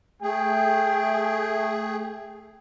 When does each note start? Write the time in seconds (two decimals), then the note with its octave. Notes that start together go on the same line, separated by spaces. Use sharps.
0.22 A3 G#4 G5